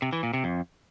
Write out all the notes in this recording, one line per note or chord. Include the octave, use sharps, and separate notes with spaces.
C3
E3
A#2
C3
F2